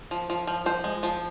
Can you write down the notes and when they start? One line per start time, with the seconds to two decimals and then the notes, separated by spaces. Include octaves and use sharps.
0.11 F3
0.30 F3
0.47 F3
0.66 F3 C5
0.84 G#3
1.03 F3